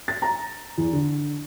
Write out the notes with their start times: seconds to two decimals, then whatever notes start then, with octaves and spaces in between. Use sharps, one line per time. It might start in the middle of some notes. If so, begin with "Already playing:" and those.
0.08 A6
0.22 A#5
0.78 E2
0.93 D3